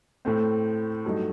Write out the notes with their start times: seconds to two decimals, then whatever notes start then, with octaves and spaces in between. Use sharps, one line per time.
0.25 A2 A3 C4
1.05 G2 F#3 A3 D#4